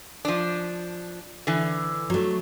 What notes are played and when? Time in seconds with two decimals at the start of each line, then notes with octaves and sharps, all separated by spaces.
0.25 F3 D4
1.47 D3 E3
2.10 F#3 A3